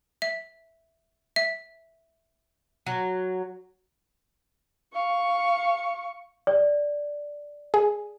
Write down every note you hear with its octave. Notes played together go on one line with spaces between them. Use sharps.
E5
E5
F#3
F5 C#6
D5
G#4